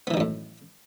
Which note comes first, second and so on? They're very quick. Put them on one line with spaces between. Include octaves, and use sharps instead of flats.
B3 E3 D#3 F#2 A2